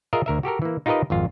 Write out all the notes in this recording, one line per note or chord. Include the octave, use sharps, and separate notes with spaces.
F4 G#4 A#4 D#5 E5
D2 A#4 E5
F#4 G4 A4 A#4
E3 A#3
D#4 F4 G4 A#4 B4 D#5
G#1 F2 F4